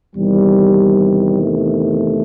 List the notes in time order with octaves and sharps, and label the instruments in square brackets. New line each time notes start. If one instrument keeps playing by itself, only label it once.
[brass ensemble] E2 C3 D#3 G3
A3